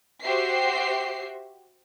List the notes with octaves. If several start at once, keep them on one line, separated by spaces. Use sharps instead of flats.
F#4 G4 C5 E5 C7